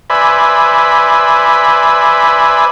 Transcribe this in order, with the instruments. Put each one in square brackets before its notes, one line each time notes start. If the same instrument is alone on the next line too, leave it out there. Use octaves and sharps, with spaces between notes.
[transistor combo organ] B4 C5 D5 E5 G#5 B5